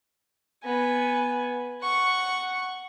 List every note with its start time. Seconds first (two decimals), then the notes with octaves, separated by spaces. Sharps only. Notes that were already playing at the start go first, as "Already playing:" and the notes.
0.64 B3 G#5
1.82 F#5 C#6